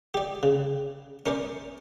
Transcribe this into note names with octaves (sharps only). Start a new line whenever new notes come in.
G4 D5
C#3
C#4 A#4 C5 D5